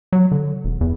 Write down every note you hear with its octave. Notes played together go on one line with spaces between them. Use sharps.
F#3
D3
E1
E2